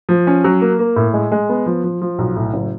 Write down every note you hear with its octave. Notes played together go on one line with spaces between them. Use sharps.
F3
C#4
F#3
A#3
A#3
A2
G#3
G#3
B3
F3
F3
F3
B1
A2
F#1